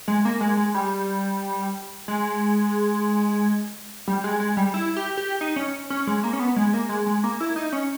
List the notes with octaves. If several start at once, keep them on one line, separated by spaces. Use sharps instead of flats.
G#3
A#3
G#3
G#3
G3
G#3
G3
G#3
G#3
G3
E4
G4
G4
D#4
C#4
C#4
G#3
A#3
C#4
B3
G#3
A#3
G#3
G#3
A#3
E4
D#4
C#4